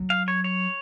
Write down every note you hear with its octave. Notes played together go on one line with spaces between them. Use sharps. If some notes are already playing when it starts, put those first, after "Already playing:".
Already playing: F#3
F5
C#5
C#5